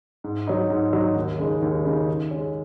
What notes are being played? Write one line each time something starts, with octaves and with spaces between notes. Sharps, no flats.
G#2
F#3 D#4
G#2
F#3 D#4
D#2
C#3 G#3 D#4
D#2
C#3 G#3 D#4
D#3
G#3 C#4